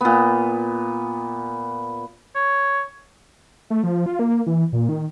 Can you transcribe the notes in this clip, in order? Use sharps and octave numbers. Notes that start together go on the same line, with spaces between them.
A#2 B3
C#5
A3
F3
F4
A#3
E3
A#2
D#3